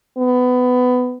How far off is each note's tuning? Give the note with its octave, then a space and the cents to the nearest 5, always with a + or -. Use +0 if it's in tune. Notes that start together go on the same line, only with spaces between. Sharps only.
B3 +20